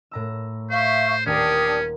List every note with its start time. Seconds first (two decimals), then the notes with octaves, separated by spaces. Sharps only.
0.11 A2 A#5 E6
0.70 C5 E5 F5 C#6
1.26 D#1 C#4 D4 G4 A#5 D#6